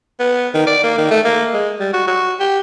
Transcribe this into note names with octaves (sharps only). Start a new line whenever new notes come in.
B3
D#3
D5
A#3
D#3
A3
A#3
G#3
G3
F#4
F#4
G4